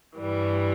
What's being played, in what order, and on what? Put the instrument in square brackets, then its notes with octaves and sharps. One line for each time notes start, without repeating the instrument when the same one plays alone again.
[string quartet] G2 E3 G3